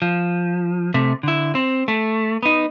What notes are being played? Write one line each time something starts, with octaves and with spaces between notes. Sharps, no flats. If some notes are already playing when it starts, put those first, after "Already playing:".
F3
C3 A3
D3 E4
C4
A3
B3 D#4